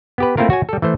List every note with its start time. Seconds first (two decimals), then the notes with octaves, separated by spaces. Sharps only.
0.18 B3 G4 B4
0.37 A3 A#3 C4 E4 F4 A#4
0.50 F#4 C#5 G#5
0.69 G3 A4
0.82 E3 A3 C5